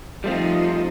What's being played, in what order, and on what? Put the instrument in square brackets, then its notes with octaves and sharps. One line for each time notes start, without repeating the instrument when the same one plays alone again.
[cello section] F3 D#4 F4 [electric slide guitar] G3 A3 C4